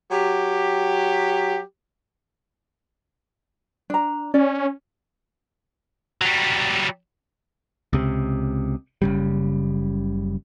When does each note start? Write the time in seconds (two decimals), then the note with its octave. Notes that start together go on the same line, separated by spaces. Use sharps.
0.11 F#3 G4
3.90 D4 A#5
4.34 C#4 D5
6.22 F#3 G3
7.93 C#2 C3
9.02 F#1 C#3 G3